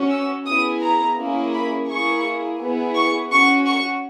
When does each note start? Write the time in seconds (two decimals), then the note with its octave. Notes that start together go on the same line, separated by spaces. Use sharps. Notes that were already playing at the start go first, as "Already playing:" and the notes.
Already playing: C#4 F#4
0.11 E6
0.47 B3 E4 G#4 D#6
0.82 A#5
1.17 A#3 C#4 E4 G#4
1.54 B5
1.89 A#3 E4 G#4 C#6
2.61 B3 E4 G#4
2.96 C#6
3.32 C#4 F#4 C#6
3.67 C#6